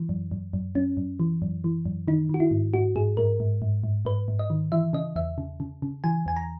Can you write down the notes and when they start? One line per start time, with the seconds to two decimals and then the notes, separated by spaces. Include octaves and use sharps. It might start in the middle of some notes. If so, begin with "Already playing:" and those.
Already playing: E3
0.09 F#2
0.31 F#2
0.53 F#2
0.75 F#2 C#4
0.97 F#2
1.20 E3
1.42 F#2
1.64 E3
1.86 F#2
2.08 D#3 D#4
2.29 D#3 F#4
2.40 E4
2.51 G#2
2.74 G#2 F#4
2.96 G#2 G#4
3.17 G#2 A#4
3.40 G#2
3.62 G#2
3.84 G#2
4.05 G#2 B4
4.28 G#2
4.39 D#5
4.50 D#3
4.72 E3 E5
4.93 C#3 D#5
5.16 E2 E5
5.38 C#3
5.60 C#3
5.82 C#3
6.04 E3 G#5
6.26 E2 G#5
6.37 A#5